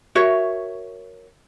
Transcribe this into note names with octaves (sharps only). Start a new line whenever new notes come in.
F#4 A#4 C#5 E5